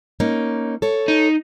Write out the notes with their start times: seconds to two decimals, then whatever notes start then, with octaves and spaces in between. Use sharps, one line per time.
0.20 A#3 C#4 D#4
0.82 A4 C#5
1.08 D#4